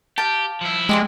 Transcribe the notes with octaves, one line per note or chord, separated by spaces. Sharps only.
G4 F5 A5
F3 E4
G#3 G4 D5 C6